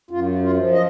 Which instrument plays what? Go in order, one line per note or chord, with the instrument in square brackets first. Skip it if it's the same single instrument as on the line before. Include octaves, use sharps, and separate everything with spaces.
[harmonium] F#2 F4
F4
F3
D#5